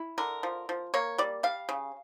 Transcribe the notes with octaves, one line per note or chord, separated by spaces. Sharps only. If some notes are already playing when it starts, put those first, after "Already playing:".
Already playing: E4
D3 A#4
F3
F3
A#3 C#5
G3 D5
G3 F5
C#3